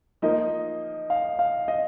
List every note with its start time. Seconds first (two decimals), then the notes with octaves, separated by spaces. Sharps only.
0.22 F3 A#3 D#4 D#5
1.10 F5
1.39 F5
1.68 D#5